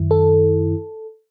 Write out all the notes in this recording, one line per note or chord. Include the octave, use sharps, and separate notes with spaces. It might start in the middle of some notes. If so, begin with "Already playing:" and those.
Already playing: F#2 D#3 E4
A4